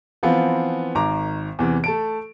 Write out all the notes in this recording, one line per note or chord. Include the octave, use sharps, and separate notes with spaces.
E3 F3 B3 C4 F4
G#1 D#3 A#5 D6
E2 C3 E3
A3 A5 D7